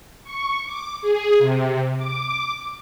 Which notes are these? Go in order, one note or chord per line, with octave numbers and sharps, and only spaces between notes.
C#6
D6
G#4
C3
D6